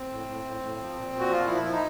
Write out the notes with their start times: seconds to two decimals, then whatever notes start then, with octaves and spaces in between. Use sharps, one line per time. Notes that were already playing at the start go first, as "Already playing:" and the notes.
Already playing: C4
0.09 A2
0.26 A2
0.43 A2
0.60 A2
0.78 F3
0.95 A#2
1.12 A#2
1.19 F#4
1.29 F3 F4
1.46 F3 E4
1.63 F3 E4
1.72 D#4